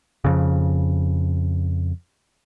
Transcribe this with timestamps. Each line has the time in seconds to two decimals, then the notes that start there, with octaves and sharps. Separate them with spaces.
0.25 F2 C#3